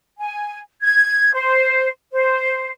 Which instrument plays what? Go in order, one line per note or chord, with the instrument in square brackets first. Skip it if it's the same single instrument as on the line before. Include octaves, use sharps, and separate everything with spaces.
[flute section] G#5
G#6
C5
C5